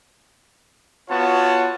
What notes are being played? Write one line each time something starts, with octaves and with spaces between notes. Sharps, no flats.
B3 F4 F#4 C#5 A5